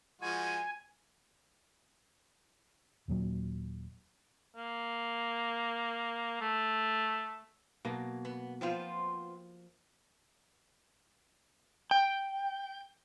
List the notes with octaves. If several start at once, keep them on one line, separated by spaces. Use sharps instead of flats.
F3 G#3 F#4 G#5
D#1 A#2 F#3
A#3
A3
B2 F#3 A#3
B3
F3 B3 C4 F4
G5